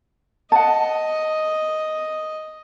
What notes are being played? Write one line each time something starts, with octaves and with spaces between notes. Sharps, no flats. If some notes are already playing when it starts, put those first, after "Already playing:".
D#5 F#5 A5